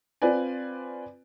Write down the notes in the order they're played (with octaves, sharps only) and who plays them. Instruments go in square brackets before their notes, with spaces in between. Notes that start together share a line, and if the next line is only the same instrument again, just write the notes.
[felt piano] C4 F4 B4 D5 G#5